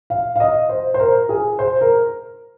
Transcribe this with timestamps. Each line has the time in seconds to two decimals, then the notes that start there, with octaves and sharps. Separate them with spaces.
0.10 F5
0.36 F5
0.40 D#5
0.69 C5
0.94 C5
0.99 A#4
1.29 G#4
1.59 C5
1.81 A#4